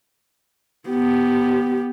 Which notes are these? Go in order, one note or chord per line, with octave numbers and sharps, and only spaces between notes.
B3 G4